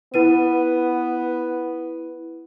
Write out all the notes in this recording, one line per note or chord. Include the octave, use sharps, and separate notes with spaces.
B3 E4 B4 D#7